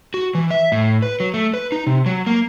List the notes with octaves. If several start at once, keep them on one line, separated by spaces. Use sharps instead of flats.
F#4
E3
E5
A2
B4
F#3
A3
B4
D#4
C3
F#3
A#3